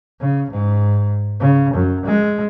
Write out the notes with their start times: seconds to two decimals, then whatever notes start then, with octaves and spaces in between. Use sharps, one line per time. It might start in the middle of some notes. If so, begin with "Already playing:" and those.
0.21 C#3
0.50 G#2
1.40 C#3
1.74 F#2
2.05 G#3